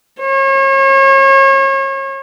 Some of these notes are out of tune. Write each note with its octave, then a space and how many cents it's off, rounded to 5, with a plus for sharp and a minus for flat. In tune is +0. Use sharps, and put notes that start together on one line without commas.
C#5 -35